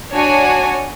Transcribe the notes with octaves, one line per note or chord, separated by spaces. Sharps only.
D4 F#4 C#5 G#5